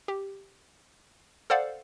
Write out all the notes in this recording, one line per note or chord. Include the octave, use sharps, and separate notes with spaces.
G4
A4 C5 D5 F5 F#5